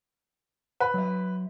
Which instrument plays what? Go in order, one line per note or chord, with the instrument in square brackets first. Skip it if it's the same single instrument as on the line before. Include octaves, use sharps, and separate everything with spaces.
[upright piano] B4
[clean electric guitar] F#3 E5